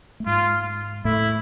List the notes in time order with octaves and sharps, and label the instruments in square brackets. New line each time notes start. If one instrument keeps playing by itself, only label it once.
[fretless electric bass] A3
[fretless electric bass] G#2 G#3 [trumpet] F4
[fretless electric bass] A2 A3 [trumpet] E4